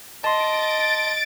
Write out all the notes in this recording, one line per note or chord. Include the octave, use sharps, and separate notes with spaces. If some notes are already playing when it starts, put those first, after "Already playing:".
D#5 A5 C6 A6 D7